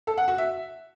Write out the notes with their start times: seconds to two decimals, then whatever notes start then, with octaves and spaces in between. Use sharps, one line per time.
0.07 A4
0.18 F#5
0.28 F#4
0.38 E5